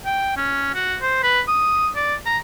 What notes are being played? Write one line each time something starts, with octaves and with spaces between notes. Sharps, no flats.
G5
C#4
F#4
C5
B4
D#6
D5
A#5